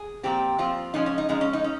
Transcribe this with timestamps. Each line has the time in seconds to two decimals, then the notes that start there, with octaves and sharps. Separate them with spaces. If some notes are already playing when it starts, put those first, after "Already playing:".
Already playing: G#4
0.23 A#2 F3 C4 G4
0.58 A#2 F3 C4 F4
0.94 F3 G#3 C#4 D#4
1.06 C#4
1.18 D#4
1.29 F3 G#3 C#4 D#4
1.41 C#4
1.53 D#4
1.64 C#4